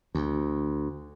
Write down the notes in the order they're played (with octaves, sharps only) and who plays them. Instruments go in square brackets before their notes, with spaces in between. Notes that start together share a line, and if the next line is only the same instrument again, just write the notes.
[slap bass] D2